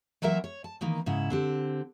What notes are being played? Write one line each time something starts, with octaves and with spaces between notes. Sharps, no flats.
E3 F#3 A#3 F4 A#4 E5
C#5
A5
D#3 E3 A#3 D#4
G#2 C#3 E4
D3 C4 G4